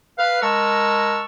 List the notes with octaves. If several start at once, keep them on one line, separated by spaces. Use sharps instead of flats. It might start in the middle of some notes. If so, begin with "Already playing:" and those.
B4 F5
G#3 A#4 A5 A#5 C#6 E6